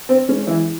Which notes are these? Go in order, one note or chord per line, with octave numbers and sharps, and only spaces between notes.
C4
G#3 C#4
E3 E4